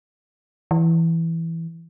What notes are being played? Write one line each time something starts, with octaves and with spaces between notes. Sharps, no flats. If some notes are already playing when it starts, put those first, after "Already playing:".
E3